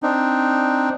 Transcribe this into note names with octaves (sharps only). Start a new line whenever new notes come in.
C4 D4 D#4